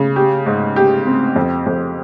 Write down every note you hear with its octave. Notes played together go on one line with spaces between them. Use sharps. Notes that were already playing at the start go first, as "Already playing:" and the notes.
Already playing: C#3
G4
G#2
G4
C4
F2
F2